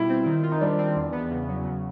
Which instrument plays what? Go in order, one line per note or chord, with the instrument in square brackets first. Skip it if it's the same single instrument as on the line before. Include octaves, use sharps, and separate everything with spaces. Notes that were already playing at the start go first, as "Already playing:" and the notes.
Already playing: [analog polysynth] B2 G3 F4 [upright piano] E4
[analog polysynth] C4
D#3
F4
[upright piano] D#4
[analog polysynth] G3 [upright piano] D4
[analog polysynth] C4
E2
B3
C#3
F#3
C#3